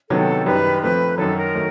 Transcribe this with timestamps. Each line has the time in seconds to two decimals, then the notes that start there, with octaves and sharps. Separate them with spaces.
0.10 C3 D#3 F#3 B3 A4
0.46 F#2 D#3 G3 B4
0.83 F3 A3 C4 B4
1.18 F#2 D#3 F#3 A4
1.37 A#4
1.55 D#3 F#3 A3